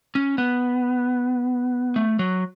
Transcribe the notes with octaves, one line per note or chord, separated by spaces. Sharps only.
C#4
B3
A3
F#3